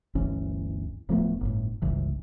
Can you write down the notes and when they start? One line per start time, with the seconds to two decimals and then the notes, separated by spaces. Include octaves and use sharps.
0.15 G1 D2 E3 C#4
1.09 D1 F3 A3 B3
1.41 G1 A2
1.82 G1 C#2 E3